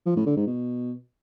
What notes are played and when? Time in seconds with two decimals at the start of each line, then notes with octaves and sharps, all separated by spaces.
0.06 F3
0.16 A2
0.26 D3
0.37 G#2
0.47 B2